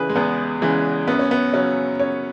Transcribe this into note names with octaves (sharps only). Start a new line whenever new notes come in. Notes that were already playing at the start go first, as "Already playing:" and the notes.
Already playing: E2 C#3 E3 G#4 B4
G#3
E2 B3
C#3 E3 G#3
F#2 B3
C#4
B3
C#3 F#3 C#4
F#2 C#5